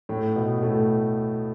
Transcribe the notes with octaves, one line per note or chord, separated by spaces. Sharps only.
A2 A3
B2 B3
A2 A3